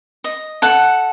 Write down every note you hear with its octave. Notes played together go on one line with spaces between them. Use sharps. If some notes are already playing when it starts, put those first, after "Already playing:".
D#5
A4 F#5